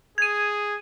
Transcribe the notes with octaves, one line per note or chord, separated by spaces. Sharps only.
G#4 G#6 D#7